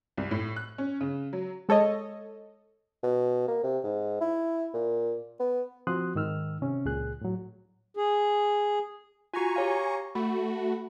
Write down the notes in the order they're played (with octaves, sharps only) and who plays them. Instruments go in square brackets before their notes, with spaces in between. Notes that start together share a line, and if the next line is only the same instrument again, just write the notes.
[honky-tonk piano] C2
A2
F#6
C#4
C#3
F#3
[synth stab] G#3 A4 C#5 D#5
[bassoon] B2
A#3
C3
G#2
E4
A#2
B3
[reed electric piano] F3 C4 F#4 C6 D#6 F#6
G#2 D#3 E6 F6
C3 C#4
C#2 A#2 G#4 F#6
A2 F#3
[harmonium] G#4
[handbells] F4 F#4 [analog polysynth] G#5 A#5 C#6
[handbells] G4 C#5 F5
[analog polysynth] A3 F#4 [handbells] B5